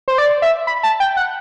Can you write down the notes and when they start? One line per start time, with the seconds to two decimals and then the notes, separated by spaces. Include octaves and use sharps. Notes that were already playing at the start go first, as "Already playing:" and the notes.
0.08 C5
0.18 D5
0.42 E5
0.67 B5
0.83 A5
1.00 G5
1.17 F#5